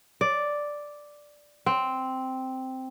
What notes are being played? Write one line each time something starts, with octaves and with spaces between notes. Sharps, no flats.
D5
C4